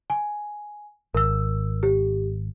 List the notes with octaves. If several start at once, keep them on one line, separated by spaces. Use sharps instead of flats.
G#5
G#1 A#4 E6
G4